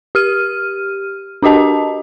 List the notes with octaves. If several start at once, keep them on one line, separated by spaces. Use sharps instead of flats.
G4 F6 D#7
D4 F#4 G4 D#5 A5